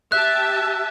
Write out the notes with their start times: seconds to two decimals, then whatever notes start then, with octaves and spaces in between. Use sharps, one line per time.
0.12 G4 E5 A5 F#6